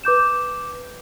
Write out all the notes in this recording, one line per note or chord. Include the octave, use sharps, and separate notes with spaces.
B4 D6 G6 E7